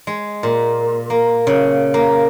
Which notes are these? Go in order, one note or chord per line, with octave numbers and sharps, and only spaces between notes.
G#3
A#2
A#3
C#3
A#3